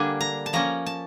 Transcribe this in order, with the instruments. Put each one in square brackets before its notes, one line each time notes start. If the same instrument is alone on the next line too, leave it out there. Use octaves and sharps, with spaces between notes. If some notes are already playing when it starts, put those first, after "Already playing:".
Already playing: [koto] D3 G3 A#3 D4 G#5
A#5
A5
F3 A#3 C#4 A#5
A5